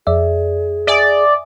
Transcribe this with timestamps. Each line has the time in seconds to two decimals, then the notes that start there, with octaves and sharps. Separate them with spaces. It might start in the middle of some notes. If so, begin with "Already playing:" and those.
0.07 F2 G#4 D5 E5
0.87 D5 E5 G#5 D#6